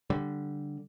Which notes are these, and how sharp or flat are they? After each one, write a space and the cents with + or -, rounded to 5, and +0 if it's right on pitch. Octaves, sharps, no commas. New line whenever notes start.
D3 +0 G3 +0